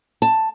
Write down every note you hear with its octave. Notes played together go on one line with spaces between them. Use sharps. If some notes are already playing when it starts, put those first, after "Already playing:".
A5